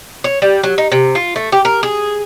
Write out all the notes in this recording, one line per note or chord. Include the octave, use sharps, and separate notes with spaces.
C#5
G3
F#3
D#4
C3
F4
A3
G4
A#4
G#4